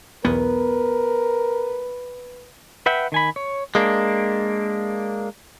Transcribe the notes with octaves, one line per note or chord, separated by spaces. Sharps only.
B1 E2 B3 A#4 B4
B4 E5 F#5 G5
D#3 G#5 B5
C#5
G#3 A#3 D4